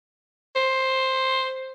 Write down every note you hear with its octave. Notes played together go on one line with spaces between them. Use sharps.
C5